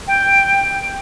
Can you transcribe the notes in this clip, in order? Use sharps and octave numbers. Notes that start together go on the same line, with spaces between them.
G5